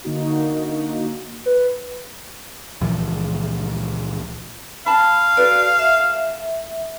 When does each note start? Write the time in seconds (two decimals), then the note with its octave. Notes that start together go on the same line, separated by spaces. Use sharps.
0.04 D3 A#3 D#4 F#4
1.46 B4
2.81 C#2 A#2 E3 F3
4.86 F5 A5 B5
5.37 F#4 A4 B4 D5
5.79 E5